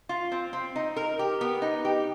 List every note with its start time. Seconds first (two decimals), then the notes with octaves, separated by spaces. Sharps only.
0.09 F4
0.32 C4
0.53 C4
0.76 D#4
0.96 A#4
1.19 G4
1.41 B3
1.62 D#4
1.85 G4